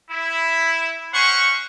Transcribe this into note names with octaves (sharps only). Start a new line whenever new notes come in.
E4
C#4 C5 F#5 C6 C#6